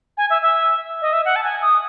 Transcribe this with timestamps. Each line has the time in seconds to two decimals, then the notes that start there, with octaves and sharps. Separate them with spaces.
0.17 G#5
0.30 E5
0.42 E5
1.02 D#5
1.13 E5
1.25 F#5
1.36 A5
1.43 G#5
1.62 D#6